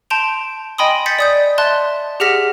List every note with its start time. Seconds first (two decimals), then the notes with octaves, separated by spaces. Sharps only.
0.10 A5 C6 G6 D7 F7
0.78 D#5 G5 G#5 B5 C6 D#6
1.06 G6 A6 B6 C#7
1.19 D5 D#6 G6
1.58 E5 A5 C6 F#6 A6
2.20 G4 G#4 F#5 F6 A#6 B6